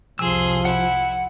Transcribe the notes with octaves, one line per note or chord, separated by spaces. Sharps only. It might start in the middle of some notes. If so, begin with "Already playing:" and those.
C2 F2 C3 F3 G#4 C6 E6
E4 F#5